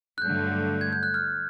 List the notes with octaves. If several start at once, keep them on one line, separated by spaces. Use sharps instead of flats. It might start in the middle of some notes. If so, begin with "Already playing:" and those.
F#6
G2 D3 F#3 A3 G6
G#6
G6
F#6
F6